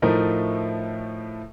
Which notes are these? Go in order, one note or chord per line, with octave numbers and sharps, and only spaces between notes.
A2 F3 A3 D#4 A#4